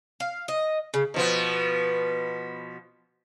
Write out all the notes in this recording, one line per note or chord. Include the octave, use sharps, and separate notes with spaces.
F5
D#5
C#3
B2 F3 B3